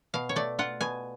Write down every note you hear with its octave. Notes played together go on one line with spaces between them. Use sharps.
B2 F5
C#5
A3 D5
F4 F#5
B2 G#5